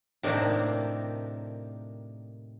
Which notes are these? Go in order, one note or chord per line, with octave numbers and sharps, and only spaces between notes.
A2 C3 D#3 A#3 D4 G5